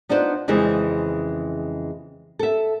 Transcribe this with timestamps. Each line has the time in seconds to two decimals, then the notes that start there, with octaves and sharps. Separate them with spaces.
0.09 B3 D4 D#4 F4 C5
0.48 F2 C#3 E3 G#3 C5
2.39 A4 E5